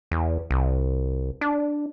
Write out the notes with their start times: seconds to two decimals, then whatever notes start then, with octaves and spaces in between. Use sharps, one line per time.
0.11 E2
0.51 C2
1.41 D4